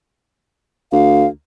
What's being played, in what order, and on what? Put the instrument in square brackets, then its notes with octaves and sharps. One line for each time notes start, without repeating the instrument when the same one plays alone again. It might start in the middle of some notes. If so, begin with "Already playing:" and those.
[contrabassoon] D2 [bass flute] F5